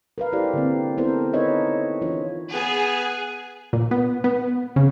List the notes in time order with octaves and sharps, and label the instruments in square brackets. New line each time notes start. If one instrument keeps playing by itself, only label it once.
[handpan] A#4 B4 F5
E4 G4 A4 C5 D5
D3 A#3 C4
B3 C4 E4 A4 A#4 C5
D#4 A4 B4 C#5 D#5 E5
E3 D4 E4 F4 C#5
[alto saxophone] B3 [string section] G#4
[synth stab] A#2
B3
B3
C#3